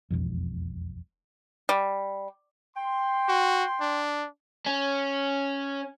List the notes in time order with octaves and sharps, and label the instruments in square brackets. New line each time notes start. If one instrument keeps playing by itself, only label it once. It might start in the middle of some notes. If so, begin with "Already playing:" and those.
[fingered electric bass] E1 B1 F2
[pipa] G3
[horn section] G5 C6
[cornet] F#4
D4
[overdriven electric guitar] C#4